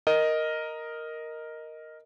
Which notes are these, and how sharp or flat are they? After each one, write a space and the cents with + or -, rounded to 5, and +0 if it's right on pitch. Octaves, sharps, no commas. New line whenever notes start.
A#4 +0 D#5 +0